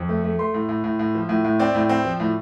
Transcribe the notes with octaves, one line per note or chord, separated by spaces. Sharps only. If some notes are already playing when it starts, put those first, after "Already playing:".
Already playing: F2
A3
A3
A3 C6
A2
A2
A2
A2
F3
A2
A2
C4 D5
A2
C4
F3
A2